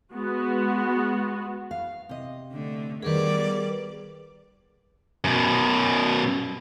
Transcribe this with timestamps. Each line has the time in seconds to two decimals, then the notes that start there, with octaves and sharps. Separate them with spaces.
0.13 G#3 B3 F#4
1.71 F5
2.09 C3 D#5
2.53 D3 A3
3.02 D#3 G3 B3 G#4 A#4 B4 D5
5.25 F#2 B2